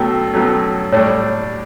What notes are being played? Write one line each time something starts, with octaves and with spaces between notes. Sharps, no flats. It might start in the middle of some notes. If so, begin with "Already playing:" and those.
Already playing: B2 F#3 A3 C#4 G5
B2 F#3 A3 C#4
A2 G3 D4 A4 C#5